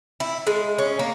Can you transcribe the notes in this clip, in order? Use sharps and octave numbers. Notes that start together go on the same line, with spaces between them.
E4
G#3
C#4
A#3